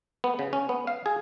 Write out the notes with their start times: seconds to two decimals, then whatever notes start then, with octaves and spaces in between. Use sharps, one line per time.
0.24 B3
0.39 C#3
0.53 C#4
0.69 B3
0.87 F5
1.06 G#4